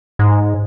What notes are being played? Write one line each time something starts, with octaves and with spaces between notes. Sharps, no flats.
G#2